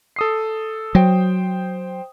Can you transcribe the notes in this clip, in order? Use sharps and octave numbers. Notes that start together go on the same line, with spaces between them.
A4 D#6 C7
F#3 C5 G5